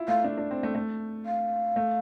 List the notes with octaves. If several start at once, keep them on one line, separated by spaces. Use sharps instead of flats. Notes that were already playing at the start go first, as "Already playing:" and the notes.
Already playing: E4 F4
A3 F5
D4
D4
C4
A3
A3
F5
A3